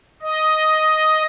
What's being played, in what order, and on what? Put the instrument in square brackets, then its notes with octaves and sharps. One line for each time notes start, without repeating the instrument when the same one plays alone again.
[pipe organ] D#5